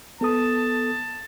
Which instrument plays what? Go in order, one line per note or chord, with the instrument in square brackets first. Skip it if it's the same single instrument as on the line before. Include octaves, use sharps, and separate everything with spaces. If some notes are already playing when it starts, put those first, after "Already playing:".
[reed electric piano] B3 A4 D#6 [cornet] A5